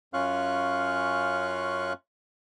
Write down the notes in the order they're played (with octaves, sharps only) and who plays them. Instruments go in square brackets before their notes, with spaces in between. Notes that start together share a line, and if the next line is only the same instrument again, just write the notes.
[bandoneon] F#2 C#4 F4 F5 C#6 F#6